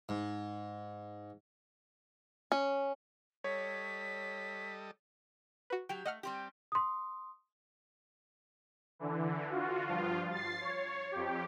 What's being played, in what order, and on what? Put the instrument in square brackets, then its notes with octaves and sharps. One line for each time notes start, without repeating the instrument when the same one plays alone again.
[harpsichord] G#2
[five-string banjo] C#4
[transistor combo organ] G3 A4 D#5 [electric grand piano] C#5 [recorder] B6
[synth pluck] F#4 B4
[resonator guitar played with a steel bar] F#3 G4 [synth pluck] G5
[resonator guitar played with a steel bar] A3 [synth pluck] D#5 F#5 F6
[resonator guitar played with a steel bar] G3 C4 G4
[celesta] C6 D#6
[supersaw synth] D3 E3
F4 F#4
G2 F3 F4
A6 C7
C#5
F2 G4